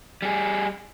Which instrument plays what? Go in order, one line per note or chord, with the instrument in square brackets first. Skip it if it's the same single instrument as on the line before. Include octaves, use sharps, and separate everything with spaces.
[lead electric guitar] G3 G#4